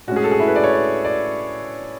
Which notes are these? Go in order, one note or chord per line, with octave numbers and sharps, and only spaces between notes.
A2 G#3 C#4 F#4
G#4
A4
G#4
E4
B4
D5
C#5
D5
D5